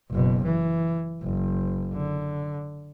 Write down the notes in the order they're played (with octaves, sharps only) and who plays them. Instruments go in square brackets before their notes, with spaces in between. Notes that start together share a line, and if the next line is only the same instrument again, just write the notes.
[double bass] F#1 B2
E3
F#1
D3